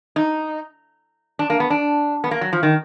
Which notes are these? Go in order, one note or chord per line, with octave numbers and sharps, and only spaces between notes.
D#4
D4
A#3
B3
D4
B3
A#3
F#3
F3
D#3